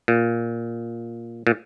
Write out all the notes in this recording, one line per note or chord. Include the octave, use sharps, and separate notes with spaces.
A#2
A#2